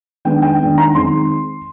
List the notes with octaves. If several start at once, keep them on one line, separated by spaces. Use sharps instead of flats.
D#3 G#3 B3 D4 G5
G5
D#3 G#3 B3 D4
A#5
D#3 G#3 C4 D#4 C6